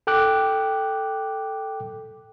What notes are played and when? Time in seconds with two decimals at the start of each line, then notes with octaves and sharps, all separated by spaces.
0.07 A4 G5 D6 F#6